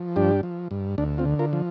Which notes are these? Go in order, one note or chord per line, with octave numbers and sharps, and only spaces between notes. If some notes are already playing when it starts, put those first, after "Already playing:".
Already playing: F3
G2 D4 G4
F3
G2
D2 D4
C4 F4
D3
F4 A#4
F3